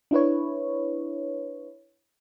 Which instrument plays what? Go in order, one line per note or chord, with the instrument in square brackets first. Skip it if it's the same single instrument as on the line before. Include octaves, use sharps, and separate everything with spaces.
[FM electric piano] D4 E4 B4 C#5